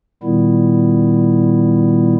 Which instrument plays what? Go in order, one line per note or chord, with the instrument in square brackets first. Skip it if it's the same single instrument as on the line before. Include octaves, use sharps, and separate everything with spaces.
[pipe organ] A#2 D#3 G3 B3 E4